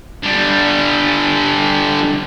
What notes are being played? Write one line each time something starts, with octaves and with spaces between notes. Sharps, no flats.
D3 G3